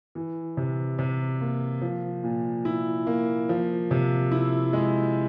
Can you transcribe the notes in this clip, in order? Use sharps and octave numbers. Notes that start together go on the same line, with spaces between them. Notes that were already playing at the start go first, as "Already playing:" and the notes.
E3
C3
C3
A#3
F3
A#2
E4
A#3
F3
C3
E4
G#3